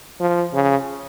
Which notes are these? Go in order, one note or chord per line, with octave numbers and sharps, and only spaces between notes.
F3
C#3